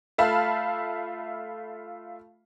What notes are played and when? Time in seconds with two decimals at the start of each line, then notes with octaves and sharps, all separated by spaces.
0.18 A3 F4 E5 F5 A5 B5